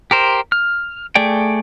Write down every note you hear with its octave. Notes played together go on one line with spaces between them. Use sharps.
G4 A#4 C5
F6
A3 G#4 D5 G5